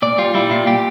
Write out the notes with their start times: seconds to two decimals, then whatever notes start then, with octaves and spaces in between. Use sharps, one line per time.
0.02 A#2 D5
0.18 G3 F4
0.34 G3 E4
0.50 A#2 F4
0.66 A#2 G4